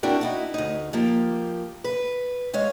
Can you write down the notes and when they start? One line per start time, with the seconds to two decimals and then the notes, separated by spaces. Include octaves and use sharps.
0.03 C4 D4 E4 F#4 A#4
0.21 D#4 E4 F#4
0.54 D2 D#4
0.93 F3 A#3 G4
1.84 B4
2.53 G#3 C#5 F5